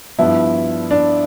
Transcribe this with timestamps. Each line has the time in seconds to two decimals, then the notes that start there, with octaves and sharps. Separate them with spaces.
0.19 G2 F3 B3 E4
0.91 D4